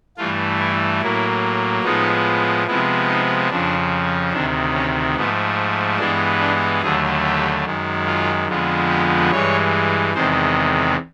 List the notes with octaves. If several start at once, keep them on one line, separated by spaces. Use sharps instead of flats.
G2 E3 A3 F4
E4
A2 F#3 A#3 E4
A2 F3 G#3 B3 D#4
C3 F3 G#3 B3 E4
D#4
F2 C#3 F3 D4
D2 C3 D#3 D4
C#4
G#2 F3 A3 B3
G2 E3 G#3 B3 D4
D4
D#2 D3 F#3 A3 G#4
G4
F#2 D#3 G#3
F4
F2 D3 F3 G#3 B3
G4
G2 E3 G#3 C#5
E2 C3 D#3 G#3 C5